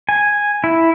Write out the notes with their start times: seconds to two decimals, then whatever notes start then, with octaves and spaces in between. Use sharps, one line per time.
0.09 G#5
0.64 E4